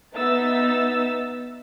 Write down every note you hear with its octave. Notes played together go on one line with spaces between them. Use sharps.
B3 D#4 E5 E6 A6